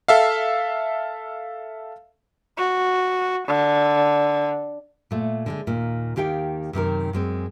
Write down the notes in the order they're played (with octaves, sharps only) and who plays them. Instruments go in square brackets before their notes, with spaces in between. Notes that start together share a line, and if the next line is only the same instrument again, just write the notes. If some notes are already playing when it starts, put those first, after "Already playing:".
[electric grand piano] A4 E5 F5
[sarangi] F#4
D3
[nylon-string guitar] A#2 A3
D3 G3 G#3
D#2 A#2
D#2 D#3 G4 F5 G5
F#2 C3 D#3 A#4
F#2 G#3 C4